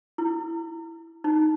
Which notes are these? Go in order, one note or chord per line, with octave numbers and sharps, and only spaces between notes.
E4
D#4